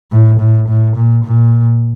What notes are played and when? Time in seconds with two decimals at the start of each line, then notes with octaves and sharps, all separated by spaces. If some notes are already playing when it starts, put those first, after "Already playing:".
0.12 A2
0.40 A2
0.68 A2
0.96 A#2
1.24 A#2